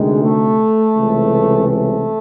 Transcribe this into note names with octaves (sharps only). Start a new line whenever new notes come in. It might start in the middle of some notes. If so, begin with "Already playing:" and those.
Already playing: D2 C3 D#3 G#3
A3
C#2 C3 E3
A3